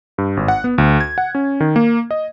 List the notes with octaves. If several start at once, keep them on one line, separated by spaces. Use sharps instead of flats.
G2
G#1
F#5
B3
D2
G#6
F#5
C#4
D#3
A#3
D#5